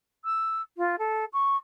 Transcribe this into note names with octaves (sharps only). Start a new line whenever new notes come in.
E6
F4
A4
C#6